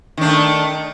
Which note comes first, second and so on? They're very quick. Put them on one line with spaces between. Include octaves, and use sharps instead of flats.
D#3 D4 A3